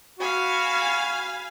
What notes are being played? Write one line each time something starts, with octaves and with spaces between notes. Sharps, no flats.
F#4 F5 G#5 B5